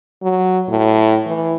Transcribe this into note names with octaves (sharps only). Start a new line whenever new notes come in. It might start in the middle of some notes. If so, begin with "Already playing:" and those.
F#3
A2
E3